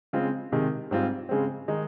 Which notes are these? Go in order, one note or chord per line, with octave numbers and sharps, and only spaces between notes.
C#3 G#3 C4 F4
C3 D#3 G#3
G#2 G3 C4 F4
C#3 G#3 C4
D#3 G#3 D#4